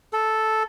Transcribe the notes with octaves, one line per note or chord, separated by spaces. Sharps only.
A4